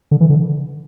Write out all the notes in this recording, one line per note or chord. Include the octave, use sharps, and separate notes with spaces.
D3
E3
D3